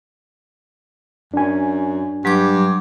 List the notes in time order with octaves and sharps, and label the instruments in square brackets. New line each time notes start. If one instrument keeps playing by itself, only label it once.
[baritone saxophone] F#2 [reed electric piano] D4 G#5
[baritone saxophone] G2 [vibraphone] F#3 D6